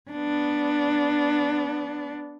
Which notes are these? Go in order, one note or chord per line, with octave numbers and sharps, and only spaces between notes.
B3 D4